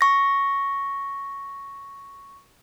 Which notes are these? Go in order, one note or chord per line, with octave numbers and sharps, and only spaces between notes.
C#6 A#6